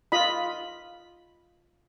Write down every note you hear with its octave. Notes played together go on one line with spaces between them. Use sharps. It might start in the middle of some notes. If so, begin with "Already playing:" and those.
F4 D#5 B5